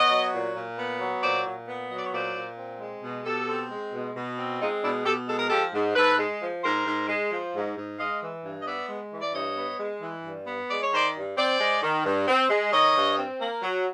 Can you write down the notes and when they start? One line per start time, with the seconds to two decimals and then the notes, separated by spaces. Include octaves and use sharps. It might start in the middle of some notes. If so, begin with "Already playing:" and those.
Already playing: B3 C#5 D#5
0.10 F#3
0.32 A#2
0.55 A#2
0.77 B3
0.99 F#3
1.22 A#2 C5 D5
1.45 A#2
1.67 B3
1.90 F#3 D#5
1.98 D5
2.05 C#5
2.12 A#2 C5 D5
2.35 A#2
2.57 C4
2.80 G#3
3.02 B2
3.25 B2 G4 A4
3.47 C4
3.70 G#3
3.93 B2
4.15 B2
4.38 C4
4.60 G#3 D#4 F4
4.83 B2 D4 E4
5.05 B2 G4 A4
5.28 G#3 A4
5.39 A#4
5.49 F3 G4 A4
5.74 G#2
5.95 G#2 A4 B4
6.18 G#3
6.41 F3
6.63 G#2 A#4 C5
6.86 G#2
7.08 G#3
7.31 F3
7.54 G#2
7.77 G#2
7.98 G#3 D#5 F5
8.21 E3
8.43 G2
8.62 D#5
8.66 B3 D5 E5
8.89 G#3
9.12 E3
9.22 D5
9.34 G2 C#5 D#5
9.57 B3
9.79 G#3
10.02 E3
10.24 G2
10.47 B3
10.69 G#3 D5
10.82 C#5
10.91 D#3 C5 D5
11.15 G2
11.36 C4 C5 D5
11.59 G#3
11.82 D#3
12.05 G2
12.27 C4
12.49 G#3
12.72 D#3 C#5 D#5
12.95 G2
13.18 C4
13.39 A#3
13.62 F#3